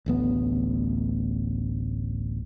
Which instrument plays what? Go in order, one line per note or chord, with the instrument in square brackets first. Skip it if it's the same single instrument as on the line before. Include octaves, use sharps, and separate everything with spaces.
[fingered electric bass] D1 A1 B3